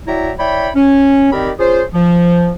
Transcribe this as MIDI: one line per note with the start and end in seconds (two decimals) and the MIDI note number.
0.08 0.31 54
0.08 0.31 64
0.08 0.31 74
0.08 0.31 76
0.08 0.31 79
0.08 0.31 82
0.39 0.70 64
0.39 0.70 73
0.39 0.70 74
0.39 0.70 79
0.39 0.70 83
0.76 1.30 61
1.32 1.51 51
1.32 1.51 60
1.32 1.51 67
1.32 1.51 70
1.32 1.51 74
1.32 1.51 83
1.59 1.83 61
1.59 1.83 65
1.59 1.83 68
1.59 1.83 72
1.94 2.52 53